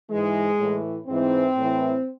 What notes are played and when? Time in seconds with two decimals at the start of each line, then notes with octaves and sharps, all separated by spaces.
0.09 G#2 E3 G#3
0.58 A2 E3
1.07 G#2 E3 C4
1.56 A2 E3